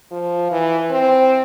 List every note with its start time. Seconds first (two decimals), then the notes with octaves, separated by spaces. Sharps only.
0.11 F3
0.51 E3
0.90 C4